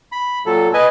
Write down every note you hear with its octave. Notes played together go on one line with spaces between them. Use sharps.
B5
A#2 F#3 A4
B4 D#5 G#5